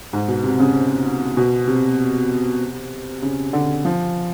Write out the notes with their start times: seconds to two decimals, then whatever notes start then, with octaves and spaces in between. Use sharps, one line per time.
0.13 G#2
0.28 B2
0.44 C3
0.59 C#3
1.37 B2
1.68 C3
3.22 C#3
3.53 D3
3.85 F3